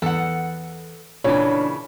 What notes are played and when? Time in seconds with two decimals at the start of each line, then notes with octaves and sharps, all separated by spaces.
0.02 E2 A4 F#5
1.24 A#2 C#3 E3 D4 C#5